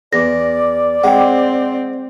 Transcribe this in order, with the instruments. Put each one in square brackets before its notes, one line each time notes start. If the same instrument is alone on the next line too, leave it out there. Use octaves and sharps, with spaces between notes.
[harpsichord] E2 [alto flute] D5 [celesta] A#6
[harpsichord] G#3 [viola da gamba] C4 [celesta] F#5 G5